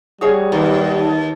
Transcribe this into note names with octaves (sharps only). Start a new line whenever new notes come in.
G3 F#4 G#4 C#5 D#6
D#2 F#3 G#4 B4
A5